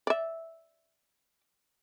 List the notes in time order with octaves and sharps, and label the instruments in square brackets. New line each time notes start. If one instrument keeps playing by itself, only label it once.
[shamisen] D5 E5